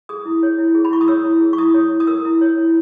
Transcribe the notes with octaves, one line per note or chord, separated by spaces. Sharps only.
G#4 D#6
E4
C#5
E4
G#4
B5
E4 C#6
D#6
C#5 E6
E4
G#4
C#6
E4 D#6
C#5
E4
D#6
A#4 E6
E4
C#5
E4